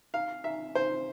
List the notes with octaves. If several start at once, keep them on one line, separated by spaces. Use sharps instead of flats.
F5
E5
C5